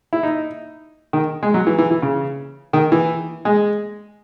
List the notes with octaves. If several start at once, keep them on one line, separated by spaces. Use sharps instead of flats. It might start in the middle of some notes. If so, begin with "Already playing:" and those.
E4
D#4
D#3
G#3
F#3
E3
E3
E3
C#3
D#3
E3
G#3